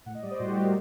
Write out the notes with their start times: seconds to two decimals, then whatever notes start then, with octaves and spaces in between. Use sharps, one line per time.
0.06 A2 F#5
0.15 D#5
0.23 G3 D5
0.31 C5
0.39 A2 F#4
0.47 G4
0.56 G3
0.64 A#4